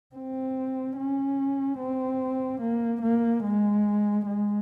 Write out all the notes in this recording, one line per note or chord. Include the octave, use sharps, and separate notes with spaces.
C4
C#4
C4
A#3
A#3
G#3
G#3